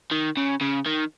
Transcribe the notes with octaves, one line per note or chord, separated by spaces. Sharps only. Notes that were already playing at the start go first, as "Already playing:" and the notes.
D#3
C#3
C#3
D#3